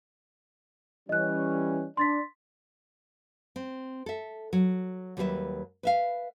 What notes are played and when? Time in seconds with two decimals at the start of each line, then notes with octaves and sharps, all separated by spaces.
1.09 E3 G3 C#4 D#5 F#6
1.97 D4 C6 A6 B6
3.56 C4
4.06 A4 E5
4.53 F#3
5.17 D#2 F#3 G3 G#4 B4 E5
5.83 B4 E5 F5